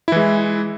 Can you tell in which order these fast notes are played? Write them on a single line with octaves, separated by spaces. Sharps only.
E4 E3 G#3